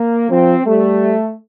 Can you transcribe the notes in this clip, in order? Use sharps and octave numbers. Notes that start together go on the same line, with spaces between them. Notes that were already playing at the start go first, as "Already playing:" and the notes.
Already playing: A#3
F3 C4
G3 A3